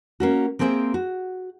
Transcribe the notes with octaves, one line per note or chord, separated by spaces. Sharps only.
A#3 C#4 F#4
A#3 C4 G#4 C5 D5 E5
F#4